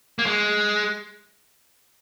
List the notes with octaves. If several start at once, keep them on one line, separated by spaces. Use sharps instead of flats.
A#3
G#3